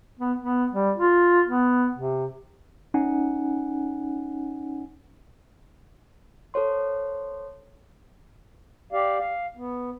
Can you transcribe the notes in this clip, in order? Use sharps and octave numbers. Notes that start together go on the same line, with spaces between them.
B3
B3
G3
F4
B3
C3
C#4 D#4 F#5 G#5
A4 C5 C#5 C6
G4 D5 F5
F5
B3